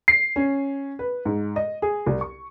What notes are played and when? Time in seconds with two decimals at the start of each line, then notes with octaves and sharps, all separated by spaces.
0.08 C7
0.36 C#4
0.99 B4
1.25 G#2
1.56 D#5
1.82 G#4
2.06 C2
2.21 C#6